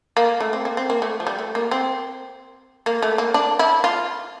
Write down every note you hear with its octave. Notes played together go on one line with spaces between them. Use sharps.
A#3
A3
C4
A#3
C4
A#3
A3
F3
G3
A3
A#3
C4
A#3
A3
A#3
D4
E4
F4